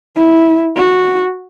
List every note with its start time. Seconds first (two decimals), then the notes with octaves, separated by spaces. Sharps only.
0.17 E4
0.77 F#4